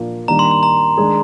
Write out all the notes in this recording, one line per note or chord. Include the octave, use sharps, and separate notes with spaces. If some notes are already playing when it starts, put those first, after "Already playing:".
Already playing: A#2 F3 A#3 D4 F4
D#3 G3 A#3 D4 A#5
C6
C6
A#5
D#3 G#3 D4 G#4